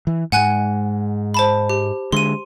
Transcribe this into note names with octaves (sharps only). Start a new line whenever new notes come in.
E3
G#2 G#3 F#5 G#5 F#6
C5 A5 B5
G4
D3 G#3 C6 D#7